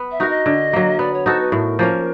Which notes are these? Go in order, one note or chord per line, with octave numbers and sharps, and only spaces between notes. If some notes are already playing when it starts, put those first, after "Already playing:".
Already playing: B3
E5
D#4 F#4 A#4
D#5
D3
F#3 A#3
B3 D5
C#5
D#4 F#4 A4 C5
B4
A2 A#4
F3 A#3 C#4